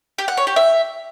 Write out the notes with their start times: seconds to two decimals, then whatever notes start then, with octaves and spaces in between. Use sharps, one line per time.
0.18 G4
0.28 F#5
0.37 C#5
0.47 G4
0.56 E5